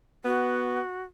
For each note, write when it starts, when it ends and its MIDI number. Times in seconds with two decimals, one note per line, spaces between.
0.25 0.80 59
0.25 1.03 66